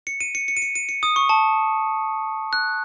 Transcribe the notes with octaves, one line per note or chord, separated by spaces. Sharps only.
C#7
D#7
C#7
C#7
D#7
C#7
D#7
C#7
D#6
C#6
A5
F#6